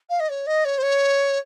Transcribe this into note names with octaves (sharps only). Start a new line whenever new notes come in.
F5
D#5
C#5
D#5
C#5
C5
C#5